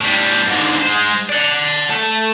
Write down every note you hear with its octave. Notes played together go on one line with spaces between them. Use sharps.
A2 G3
G#2 D3
G#3 C5
D5 F#5
A3